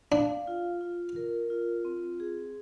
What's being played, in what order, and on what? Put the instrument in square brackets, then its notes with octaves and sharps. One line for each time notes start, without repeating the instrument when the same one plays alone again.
[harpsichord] D4 [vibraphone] F5
[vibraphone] F4
F4
A#4
F4
C4
G#4